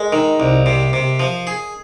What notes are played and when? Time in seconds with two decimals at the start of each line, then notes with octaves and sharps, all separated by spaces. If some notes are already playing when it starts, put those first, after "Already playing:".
Already playing: G#3 G#4 A#4 D#5
0.12 D#3 A#4
0.40 C2
0.66 C3
0.93 C3
1.20 F3
1.47 G#4